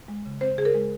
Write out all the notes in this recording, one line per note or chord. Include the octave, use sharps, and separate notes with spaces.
G#3
C#3
C4 C5
C#3 G#4
A#4
G#3